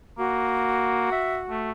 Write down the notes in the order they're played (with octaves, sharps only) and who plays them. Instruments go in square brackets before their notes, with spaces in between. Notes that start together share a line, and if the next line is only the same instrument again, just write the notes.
[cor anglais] A#3 [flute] F#4
[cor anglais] E5
A3